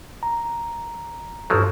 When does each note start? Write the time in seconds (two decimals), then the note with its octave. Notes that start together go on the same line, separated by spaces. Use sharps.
0.23 A#5
1.50 A1 G2 F3 F#3 A4